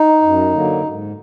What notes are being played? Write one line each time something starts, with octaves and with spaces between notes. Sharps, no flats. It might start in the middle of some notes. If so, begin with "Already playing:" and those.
Already playing: D#4
F#2
D3 F#3 A#3
G#2